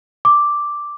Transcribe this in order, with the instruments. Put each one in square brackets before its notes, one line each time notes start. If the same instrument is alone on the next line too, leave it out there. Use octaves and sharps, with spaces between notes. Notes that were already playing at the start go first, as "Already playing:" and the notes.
[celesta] D6